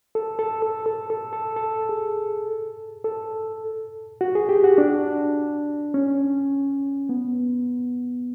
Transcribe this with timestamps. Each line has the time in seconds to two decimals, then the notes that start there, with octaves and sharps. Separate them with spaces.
0.15 A4
0.39 A4
0.62 A4
0.86 A4
1.10 A4
1.33 A4
1.56 A4
1.89 G#4
3.04 A4
4.21 F#4
4.35 G#4
4.49 G4
4.64 F#4
4.78 D4
5.94 C#4
7.09 B3